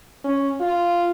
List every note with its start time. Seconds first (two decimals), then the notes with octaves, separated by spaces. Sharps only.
0.24 C#4
0.60 F4